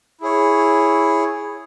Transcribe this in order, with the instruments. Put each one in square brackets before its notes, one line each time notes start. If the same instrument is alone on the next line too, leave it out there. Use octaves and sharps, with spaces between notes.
[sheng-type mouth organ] E4 G#4 C#5